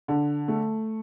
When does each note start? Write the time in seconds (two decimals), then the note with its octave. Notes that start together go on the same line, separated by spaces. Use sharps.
0.08 D3
0.48 A3